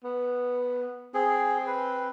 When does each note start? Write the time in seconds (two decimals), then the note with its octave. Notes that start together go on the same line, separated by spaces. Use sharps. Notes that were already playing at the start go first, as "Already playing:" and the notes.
0.04 B3
1.14 C4 G#4
1.67 B4